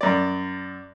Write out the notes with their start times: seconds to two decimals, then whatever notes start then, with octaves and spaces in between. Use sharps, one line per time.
0.01 F#2 D5